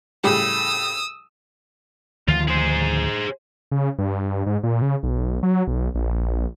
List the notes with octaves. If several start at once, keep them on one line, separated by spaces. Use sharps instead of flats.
A2 C#3 G3 D#6 E6
D2 D#3 F3 F4
G#4 C5
C#3
G2
G#2
A#2
C#3
B1
F#3
B1
A#1